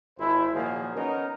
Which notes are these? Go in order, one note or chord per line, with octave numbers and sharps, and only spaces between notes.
G#1 E4 C5
A#2 D#3 F3 F#3 A#3 G#4
B3 C#4 D#4 A#4